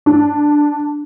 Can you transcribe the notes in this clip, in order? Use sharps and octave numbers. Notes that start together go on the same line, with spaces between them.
D4